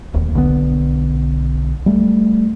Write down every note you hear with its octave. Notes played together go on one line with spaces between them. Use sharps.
D1 D#2
B1 D3 F3 B3
G3 A3